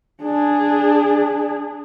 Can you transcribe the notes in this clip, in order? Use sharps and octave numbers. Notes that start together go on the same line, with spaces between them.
D4 G#4